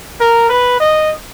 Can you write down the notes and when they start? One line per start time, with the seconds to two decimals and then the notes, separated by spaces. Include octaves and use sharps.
0.19 A#4
0.50 B4
0.80 D#5